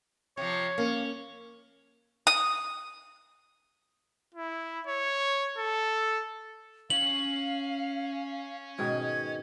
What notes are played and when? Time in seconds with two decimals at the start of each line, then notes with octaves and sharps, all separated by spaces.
0.37 C3 F3 C#5
0.78 A#3 C#4
2.27 D#6
4.34 E4
4.87 C#5
5.58 A4
6.90 C#4 C#5 F5 F#7
8.78 G#2 B2 D#3 G#6